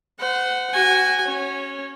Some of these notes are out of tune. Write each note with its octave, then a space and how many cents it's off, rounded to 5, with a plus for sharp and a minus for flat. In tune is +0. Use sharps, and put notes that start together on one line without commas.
C5 -35 F#5 +0
F#4 +20 G#5 -20
C#4 +0 C#5 -15